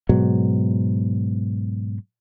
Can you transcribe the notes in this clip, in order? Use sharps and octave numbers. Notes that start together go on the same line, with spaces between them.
G#2 B2 F#3